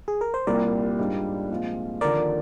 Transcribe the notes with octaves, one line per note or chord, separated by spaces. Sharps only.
G#4
A#4
C5
C2 A#2 G3 A#3 A#4 D5
G#2 G3 D4 F4
A#2 F3 G#3 C4 F4
D#2 D3 F3 A#4 D5